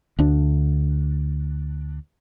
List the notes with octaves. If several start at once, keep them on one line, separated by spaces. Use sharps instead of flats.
D2 D4